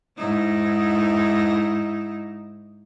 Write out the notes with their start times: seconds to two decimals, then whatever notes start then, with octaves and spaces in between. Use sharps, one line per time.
0.17 G#2 D#4 E4